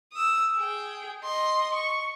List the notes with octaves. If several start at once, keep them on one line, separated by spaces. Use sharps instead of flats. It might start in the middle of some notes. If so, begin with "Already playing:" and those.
D#6 E6
G#4 G5
D#5 C6
C#6